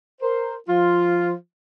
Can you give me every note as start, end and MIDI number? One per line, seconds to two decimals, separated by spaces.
0.21 0.54 70
0.21 0.54 72
0.68 1.34 53
0.68 1.34 65